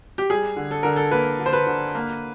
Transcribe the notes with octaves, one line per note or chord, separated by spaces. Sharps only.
G4
G3 G#4
D3
A4
D3 A#4
A4
A#3 B4
D3
C5
B4
D3
A#3